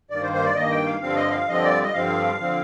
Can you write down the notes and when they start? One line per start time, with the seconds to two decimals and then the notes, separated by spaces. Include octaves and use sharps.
0.10 G2 D#3 A#3 D5
0.22 C5
0.33 C5
0.45 D5
0.56 G2 D#3 A#3 D#5
0.71 G5
0.86 F5
1.01 G2 D3 F3 C4 F5
1.16 D#5
1.29 F5
1.48 G2 D3 F3 C4 D#5
1.64 D5
1.83 D#5
1.94 G2 D3 F3 C4 F5
2.40 D3 F3 C4